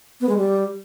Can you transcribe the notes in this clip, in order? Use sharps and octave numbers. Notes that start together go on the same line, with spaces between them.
B3
G#3
G3